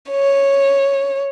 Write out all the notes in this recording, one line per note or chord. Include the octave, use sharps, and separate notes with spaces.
C#5